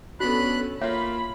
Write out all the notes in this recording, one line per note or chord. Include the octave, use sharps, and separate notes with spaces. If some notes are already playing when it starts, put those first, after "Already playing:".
B3 C#4 D4 F#4 A4 B5 F#6
A#3 F4 C#5 E5 F5 B5